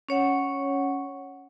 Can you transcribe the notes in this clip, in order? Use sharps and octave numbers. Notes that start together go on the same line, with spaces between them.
C#4 C#5 F#5